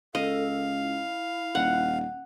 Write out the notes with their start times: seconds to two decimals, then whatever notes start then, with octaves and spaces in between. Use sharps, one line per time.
0.15 C#2 A4 D#5 F5
0.78 E4
1.55 D#1 F#5